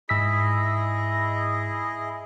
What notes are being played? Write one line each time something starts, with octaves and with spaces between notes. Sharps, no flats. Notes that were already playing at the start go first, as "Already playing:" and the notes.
G#2 E4 G#4 D#5 E6 B6